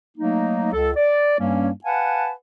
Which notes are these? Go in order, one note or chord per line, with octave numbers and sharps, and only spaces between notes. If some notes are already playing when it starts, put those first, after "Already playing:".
F#3 A3 A#3 D#4
C#2 A4
D5
G2 G3 A#3 C#4
B4 F5 F#5 G#5 A5